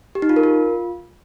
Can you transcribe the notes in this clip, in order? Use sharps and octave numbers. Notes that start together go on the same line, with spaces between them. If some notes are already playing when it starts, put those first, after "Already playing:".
G4
D#4
F4
A#4
F4